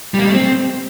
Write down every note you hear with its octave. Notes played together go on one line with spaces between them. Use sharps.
G3
A#3
G3
A3
C4